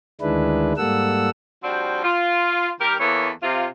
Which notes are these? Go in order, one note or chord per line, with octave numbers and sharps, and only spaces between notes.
D2 D#3 G#3 D4 E4 B4
G#2 G3 A#3 A4 F#5 E6
F3 G3 C4 D4 F#4 C5
F4
D#3 G3 G4 A#4
E2 E3 A#3 B3 A4 C#5
C3 F4